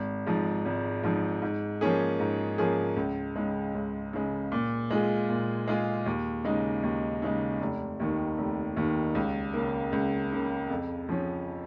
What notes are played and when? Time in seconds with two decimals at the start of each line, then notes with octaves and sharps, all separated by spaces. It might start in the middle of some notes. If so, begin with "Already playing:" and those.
Already playing: G#1
0.27 G#2 F3
0.65 G#1
1.03 G#2 F3
1.42 G#2
1.81 F3 A#3 C#4 G#4
2.19 G#2
2.58 F3 A#3 C#4 G#4
2.96 C#2
3.36 C#3 G#3
3.74 C#2
4.13 C#3 G#3
4.52 A#2
4.90 G#3 F4 G#4
5.29 A#2
5.68 G#3 F4 G#4
6.06 D#2
6.44 C#3 G#3 D#4
6.83 D#2
7.22 C#3 G#3 D#4
7.61 F1
8.00 D#2 D#3
8.38 F1
8.77 D#2 D#3
9.15 C#2
9.53 C#3 A#3
9.92 C#2
10.32 C#3 A#3
10.70 F2
11.09 F3 C#4